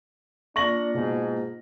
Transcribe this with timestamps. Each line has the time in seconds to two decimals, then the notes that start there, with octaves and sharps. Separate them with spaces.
0.56 A#3 D4 F4 C#6 A#6 F#7
0.94 G#2 B2